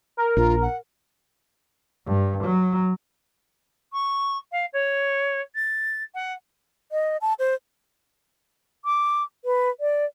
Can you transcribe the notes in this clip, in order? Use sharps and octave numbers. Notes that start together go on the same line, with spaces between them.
A#4
A#1 F4
F#5
G2
F#3
C#6
F5
C#5
A6
F#5
D#5
A5
C5
D6
B4
D5